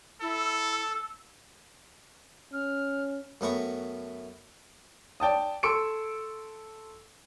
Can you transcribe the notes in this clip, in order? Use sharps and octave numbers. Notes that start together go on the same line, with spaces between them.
E4 A4 E6
C#4 F6
F#2 A3 B3 G5 A#5 C#6
D5 G5 A5 D#6
A4 C6 C#6 E6 C#7 D7